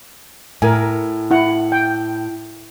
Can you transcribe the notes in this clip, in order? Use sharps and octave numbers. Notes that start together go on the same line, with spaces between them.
A2 A#4 G#5
E4 F#5
G5